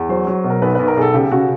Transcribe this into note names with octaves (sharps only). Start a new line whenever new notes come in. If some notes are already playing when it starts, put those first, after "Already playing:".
Already playing: E2
F#3 C5
F#3
B2
A#4
B1 B4
B1 B4
A#4
B1 G#4 A4
C#3 G4
C#3 F#4